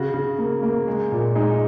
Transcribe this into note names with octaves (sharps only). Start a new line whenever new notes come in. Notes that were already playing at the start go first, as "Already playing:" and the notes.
Already playing: C#3 F#4
C#3
A#3
A#3
G#3
A#2
G#3 D#4